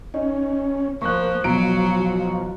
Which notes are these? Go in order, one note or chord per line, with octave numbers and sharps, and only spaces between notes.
C#4 D#4
F3 A#3 C#6 F#6
B2 F3 F#3 F#4 A#5 D7